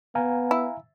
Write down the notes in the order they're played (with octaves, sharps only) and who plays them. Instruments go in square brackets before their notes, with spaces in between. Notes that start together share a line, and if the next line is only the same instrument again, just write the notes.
[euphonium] B3 [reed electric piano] F5 G#5 A#5
[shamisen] E4